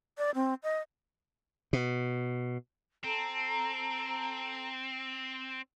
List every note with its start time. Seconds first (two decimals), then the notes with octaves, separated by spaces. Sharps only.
0.18 D5
0.35 C4
0.63 D#5
1.73 B2
3.04 C4 A4 A#5